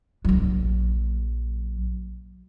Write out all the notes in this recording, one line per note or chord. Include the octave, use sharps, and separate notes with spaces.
A#1 F#3